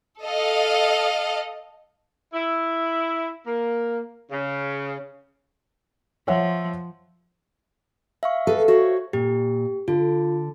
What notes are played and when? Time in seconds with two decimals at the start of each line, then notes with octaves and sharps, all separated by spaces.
0.23 A4 D#5 F5
2.33 E4
3.47 A#3
4.31 C#3
6.28 F3 C#5 E5 F#5
8.23 E5 F5 C#6
8.47 G#4 A4 B4
8.68 F#4 C5 C#5
9.13 A#2 G4
9.88 D3 F4